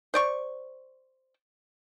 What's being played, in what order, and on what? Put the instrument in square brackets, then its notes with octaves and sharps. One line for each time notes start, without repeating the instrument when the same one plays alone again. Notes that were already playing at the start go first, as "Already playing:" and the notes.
[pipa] C5 D5 C#6